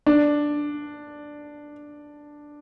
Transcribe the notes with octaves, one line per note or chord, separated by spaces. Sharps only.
D4